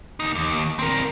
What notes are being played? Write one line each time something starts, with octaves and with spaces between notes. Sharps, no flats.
D#2 D#4
D#2
C4 A#4